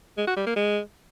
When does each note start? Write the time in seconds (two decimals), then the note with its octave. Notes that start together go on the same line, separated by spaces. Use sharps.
0.18 G#3
0.27 F#4
0.37 G3
0.46 A#3
0.56 G#3